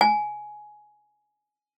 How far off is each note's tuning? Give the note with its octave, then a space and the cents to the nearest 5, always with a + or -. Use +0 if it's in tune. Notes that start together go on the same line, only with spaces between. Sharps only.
G#5 +15